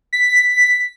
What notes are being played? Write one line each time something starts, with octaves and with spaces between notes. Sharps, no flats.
B6